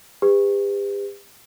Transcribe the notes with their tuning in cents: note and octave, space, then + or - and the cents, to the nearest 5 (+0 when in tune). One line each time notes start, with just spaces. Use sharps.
G4 +40 B4 +30